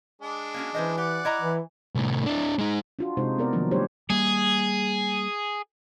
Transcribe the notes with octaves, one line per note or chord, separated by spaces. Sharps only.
G#3 D4
A#3 C#4 F#4
E3 C#4 C5 D#5
G4 D5 F#5
E4 D#5 A#5
E3
C2 A2
D4 E4
G#3 D#4
D4 F4 F#4
C3 G#3 D#4 C5
B3 A#4 D5
D#3 F3 F#3 A#3 D4
G3 A3 D4 G4 C5 C#5
G3 A#3 G#4